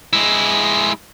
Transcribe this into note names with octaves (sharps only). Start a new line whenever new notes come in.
G#3 E4